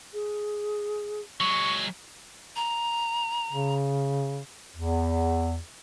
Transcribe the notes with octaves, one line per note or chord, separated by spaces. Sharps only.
G#4
F#3 G#3 C#6
A#5
C#3
E2